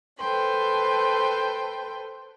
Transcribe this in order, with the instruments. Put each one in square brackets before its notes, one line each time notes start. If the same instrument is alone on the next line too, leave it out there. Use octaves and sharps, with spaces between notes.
[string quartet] A4 B4 C5 G5 C6